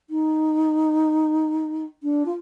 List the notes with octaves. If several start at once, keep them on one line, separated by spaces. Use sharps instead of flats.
D#4
D4
F4